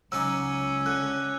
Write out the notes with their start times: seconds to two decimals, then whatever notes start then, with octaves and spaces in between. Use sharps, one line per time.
0.12 C#2 F#3 C#4 D#4 D5 E6
0.86 D3 F#6